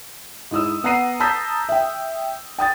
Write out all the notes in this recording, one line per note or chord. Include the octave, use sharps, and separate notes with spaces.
G#2 E4 D#6 E6
B3 F#5 A#5 C7 D#7
A5 A#5 D#6 E6 G6 B6
E5 G5
G5 D#6 A6